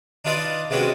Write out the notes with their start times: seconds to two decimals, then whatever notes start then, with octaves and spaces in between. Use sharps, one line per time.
0.25 D4 D#4 F4 B4 D5 D#5
0.70 C3 G#3 B3 C#4 D4 F#4